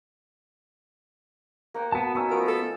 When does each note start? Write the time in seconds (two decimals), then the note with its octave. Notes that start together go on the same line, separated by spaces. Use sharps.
1.74 A#3 F#5 G5
1.92 B3 F#4 A5
2.15 B3 C#4 D#4 A#5 E6
2.30 F3 A3 A#4
2.48 A4